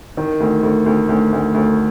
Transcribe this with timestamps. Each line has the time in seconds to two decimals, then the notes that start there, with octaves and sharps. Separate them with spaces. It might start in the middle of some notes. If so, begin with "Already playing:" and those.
0.17 D#3
0.40 D2
0.63 D2
0.86 D2
1.09 D2
1.33 D2
1.54 D2